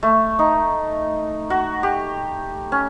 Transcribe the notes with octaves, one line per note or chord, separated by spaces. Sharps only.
A3
D#4
F#4
G4
C#4